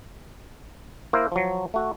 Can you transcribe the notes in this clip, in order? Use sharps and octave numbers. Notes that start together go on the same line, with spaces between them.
A#3 E4 A#4 C5
F3 F#3
A3 F#4